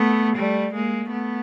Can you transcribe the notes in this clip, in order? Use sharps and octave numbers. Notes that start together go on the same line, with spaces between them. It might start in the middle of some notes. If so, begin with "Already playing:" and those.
Already playing: A3 B3
G3 A3
G#3 A#3
A3 B3